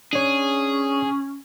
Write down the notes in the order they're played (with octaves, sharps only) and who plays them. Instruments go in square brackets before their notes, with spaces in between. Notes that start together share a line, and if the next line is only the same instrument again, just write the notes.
[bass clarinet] C#4 [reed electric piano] D4 C#5 [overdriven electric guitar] G#4